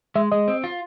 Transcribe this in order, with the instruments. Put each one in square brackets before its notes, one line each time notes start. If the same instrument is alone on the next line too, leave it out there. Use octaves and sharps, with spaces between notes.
[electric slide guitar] G#3 [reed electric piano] E5
[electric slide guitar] G#3 [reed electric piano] D#5
[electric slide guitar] C4
F4